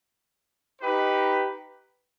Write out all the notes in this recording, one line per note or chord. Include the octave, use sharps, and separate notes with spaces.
D#4 G4 B4